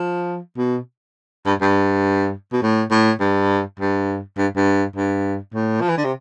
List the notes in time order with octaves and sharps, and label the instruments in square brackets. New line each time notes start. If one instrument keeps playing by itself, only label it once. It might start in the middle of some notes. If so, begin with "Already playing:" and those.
Already playing: [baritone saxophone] F3
B2
G2
G2
B2
A2
A2
G2
G2
G2
G2
G2
A2
F3
E3
D3
C3